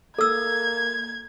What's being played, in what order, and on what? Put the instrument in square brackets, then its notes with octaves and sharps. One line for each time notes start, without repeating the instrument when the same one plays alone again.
[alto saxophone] A#3 [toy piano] A4 E6 [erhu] G#6